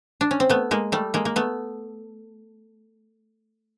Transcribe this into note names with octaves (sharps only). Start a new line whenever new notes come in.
D4
C#4
C4
A3 B3
G#3 A#3
G3 A3
G#3 A#3
A#3
A3 B3